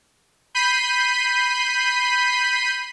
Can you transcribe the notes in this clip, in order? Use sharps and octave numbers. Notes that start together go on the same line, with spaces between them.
B5 G6 B6 C7 D#7